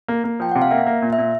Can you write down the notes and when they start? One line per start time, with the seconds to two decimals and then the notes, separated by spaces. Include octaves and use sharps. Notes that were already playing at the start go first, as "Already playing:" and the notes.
0.08 A#3
0.24 A#3
0.40 F3 G5
0.52 C3 F#5
0.62 F5
0.71 A#3 E5
0.86 A#3
1.02 A#2
1.13 E5
1.18 A#2